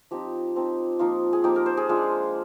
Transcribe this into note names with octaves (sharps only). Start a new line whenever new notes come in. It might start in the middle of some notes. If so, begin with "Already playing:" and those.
F3 C4 D#4 G4
F3 C4 D#4
F3 A#3 D#4 F4
G#4
F3 A#3 D#4 G4
A#4
C5
G#4
G#3 D4 F4